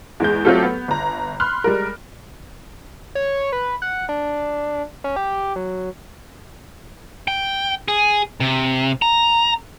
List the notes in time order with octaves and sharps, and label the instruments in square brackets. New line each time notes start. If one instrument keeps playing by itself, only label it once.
[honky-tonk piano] E2 G#3 G6
F#3 A3 C4 F4 G4 A4
B3
G1 A#5
B5 C6 F6 F#6
G3 G#3 A#4
[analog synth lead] C#5
B4
F#5
D4
C#4
G4
F#3
[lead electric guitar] G5
G#4
C3
A#5